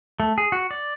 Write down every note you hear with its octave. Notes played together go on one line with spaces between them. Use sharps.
A3
G#4
F#4
D5